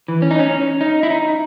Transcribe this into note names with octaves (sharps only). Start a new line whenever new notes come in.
E3
C#4
D#4
C#4
D#4
E4
D#4